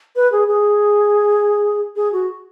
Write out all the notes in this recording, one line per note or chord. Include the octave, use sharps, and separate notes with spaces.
B4
G#4
G#4
G#4
F#4